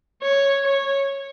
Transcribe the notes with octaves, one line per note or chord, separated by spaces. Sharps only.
C#5
C#5